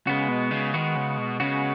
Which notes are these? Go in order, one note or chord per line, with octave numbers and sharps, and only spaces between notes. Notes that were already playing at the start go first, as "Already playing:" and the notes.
C#3 G#3 B3 F#4
B2
C#3
D#3 G#3 B3 F#4
C#3
B2
C#3 G#3 B3 F#4